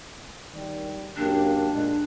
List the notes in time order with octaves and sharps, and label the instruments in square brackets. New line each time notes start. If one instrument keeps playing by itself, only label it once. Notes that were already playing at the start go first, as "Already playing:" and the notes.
[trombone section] D#3 G3
[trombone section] F#2 A#3 G4 [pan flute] D4
[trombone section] A#2 G#3